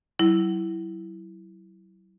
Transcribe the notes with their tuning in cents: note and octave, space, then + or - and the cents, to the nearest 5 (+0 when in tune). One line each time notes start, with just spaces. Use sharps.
F#3 +35 E4 +0